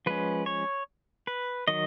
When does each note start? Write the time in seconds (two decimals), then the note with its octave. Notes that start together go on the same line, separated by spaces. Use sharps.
0.06 F3 G#3 C#4 B4
0.46 C#5
1.27 B4
1.68 D#3 F#3 D#5